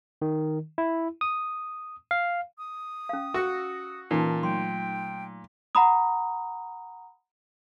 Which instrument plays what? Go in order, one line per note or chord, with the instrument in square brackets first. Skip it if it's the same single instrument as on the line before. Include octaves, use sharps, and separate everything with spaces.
[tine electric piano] D#3
E4
D#6
F5
[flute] D#6
[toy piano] C#4 F5
[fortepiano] F#4 [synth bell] E6 A#6 C#7
[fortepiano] A#2 [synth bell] E3 C#4 A#4 [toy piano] D#4 [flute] A5
[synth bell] F#3 A3 [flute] G5 [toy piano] C6
[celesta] F#5 A#5 B5 D#6